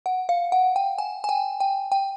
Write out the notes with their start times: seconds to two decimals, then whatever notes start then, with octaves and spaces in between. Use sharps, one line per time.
0.06 F#5
0.29 F5
0.52 F#5
0.76 G5
0.98 G#5
1.24 G#5
1.29 G5
1.60 G5
1.92 G5